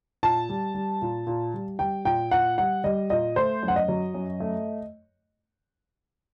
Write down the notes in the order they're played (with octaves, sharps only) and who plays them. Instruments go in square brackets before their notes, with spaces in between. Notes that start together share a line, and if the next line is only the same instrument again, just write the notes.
[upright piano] A#2 A5
G3
G3
A#2
A#2
G3
G3 G5
A#2 G5
A#2 F#5
G3 F#5
G3 D#5
A#2 D#5
A3 C5
F#2
F#5
D#5
F#3
F#2
A3